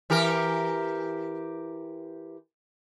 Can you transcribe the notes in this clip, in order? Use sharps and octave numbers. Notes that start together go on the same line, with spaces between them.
E3 G4 A#4